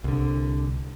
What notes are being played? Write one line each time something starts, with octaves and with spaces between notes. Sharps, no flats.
C2 D3